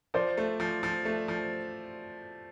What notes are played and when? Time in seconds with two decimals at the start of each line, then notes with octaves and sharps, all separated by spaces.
0.14 F3 C5 D5
0.37 A3
0.60 F3
0.83 F3
1.05 A3
1.28 F3